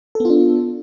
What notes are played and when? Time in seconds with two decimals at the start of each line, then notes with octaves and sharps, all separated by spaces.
0.15 A4
0.20 B3
0.25 F4
0.30 D4